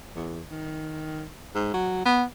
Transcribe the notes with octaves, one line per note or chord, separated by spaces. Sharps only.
E2
D#3
G#2
F#3
B3